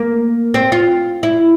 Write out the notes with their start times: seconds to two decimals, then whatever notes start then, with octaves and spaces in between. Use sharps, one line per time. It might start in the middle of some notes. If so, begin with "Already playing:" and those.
Already playing: A#3
0.54 C4
0.72 F4
1.23 E4